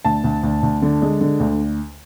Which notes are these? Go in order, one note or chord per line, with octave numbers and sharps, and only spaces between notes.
D2 A5
D2
D2
D2
D3
G#3
D3
D2